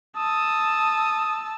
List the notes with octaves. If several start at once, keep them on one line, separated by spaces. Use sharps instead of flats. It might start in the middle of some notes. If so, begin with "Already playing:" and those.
A5 D#6 E6